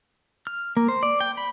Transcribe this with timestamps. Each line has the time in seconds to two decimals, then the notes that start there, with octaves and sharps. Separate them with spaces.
0.47 F6
0.77 A#3
0.88 C5
1.03 D5
1.20 G5
1.37 B5